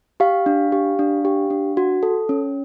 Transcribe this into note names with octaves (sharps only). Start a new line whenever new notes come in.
G4 F5
D4
G4
D4
G4
D4
F#4
A4
C#4